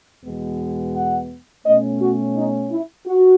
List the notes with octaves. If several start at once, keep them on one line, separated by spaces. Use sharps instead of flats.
E2 B2 G#3 B3
F#5
B2 A3 C#4 D#5
F#4
D#4
E4
F#4